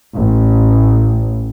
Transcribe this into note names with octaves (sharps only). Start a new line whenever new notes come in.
A1